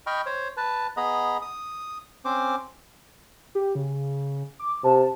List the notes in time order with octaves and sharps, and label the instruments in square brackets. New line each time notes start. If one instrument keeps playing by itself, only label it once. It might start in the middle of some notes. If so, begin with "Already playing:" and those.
[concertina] D#5 G5 B5 C#6 F6
C5 C#5
B4 A5
B3 G#4 D#5 A#5 B5
D#6
C4 C#4 C5 D6
[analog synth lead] G4
C#3
D6
[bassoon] C3 [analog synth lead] A5